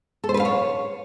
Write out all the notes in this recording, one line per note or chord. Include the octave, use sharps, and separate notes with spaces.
A4
C5
B4
F5
C#5